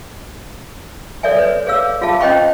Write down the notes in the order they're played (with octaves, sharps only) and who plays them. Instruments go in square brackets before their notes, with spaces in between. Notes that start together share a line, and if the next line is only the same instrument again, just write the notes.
[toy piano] A4 C#5 D5 E5 G#5
A4 B4 C#5
G#4 C#5 F5 E6
F4 G#4 E5 F5 A5
C#4 C5 D#5 G5 B5 C#6